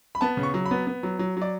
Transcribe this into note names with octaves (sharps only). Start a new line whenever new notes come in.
B5
B3 A5
C#3
C#6
F#3
B5
B3
B3
F#3
F#3
F#3 D5